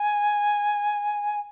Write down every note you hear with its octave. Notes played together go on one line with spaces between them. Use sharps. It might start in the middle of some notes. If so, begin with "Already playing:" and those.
Already playing: G#5